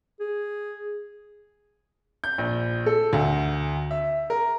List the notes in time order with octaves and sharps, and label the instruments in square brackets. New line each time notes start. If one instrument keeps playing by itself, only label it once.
[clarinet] G#4
[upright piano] G6
A#1
A4
D2
E5
A#4